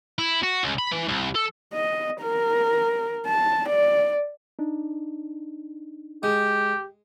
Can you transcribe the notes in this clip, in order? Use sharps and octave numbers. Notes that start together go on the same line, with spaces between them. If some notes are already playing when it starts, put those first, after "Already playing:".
E4
F#4
C#2
B5
E3
C2
A4
D#5
A#4
A5
D5
D4 D#4
G#3 G4